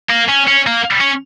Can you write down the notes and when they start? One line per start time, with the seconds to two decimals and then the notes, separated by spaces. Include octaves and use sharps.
0.10 A#3
0.29 C#4
0.48 C#4
0.67 A#3
1.01 C#4